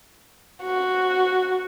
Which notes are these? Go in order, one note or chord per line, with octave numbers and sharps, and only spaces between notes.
F#4